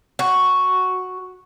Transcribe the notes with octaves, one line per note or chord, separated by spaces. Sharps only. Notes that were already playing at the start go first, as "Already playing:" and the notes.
F#4